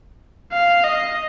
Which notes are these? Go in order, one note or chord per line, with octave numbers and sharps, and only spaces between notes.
F5
D#5